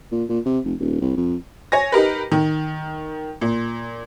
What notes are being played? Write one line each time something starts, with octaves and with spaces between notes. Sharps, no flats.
A#2
A#2
C3
F1
D#1
C2
F2
C#5 G#5 A#6
D#4 G4 A#4 B4
D#3
A#2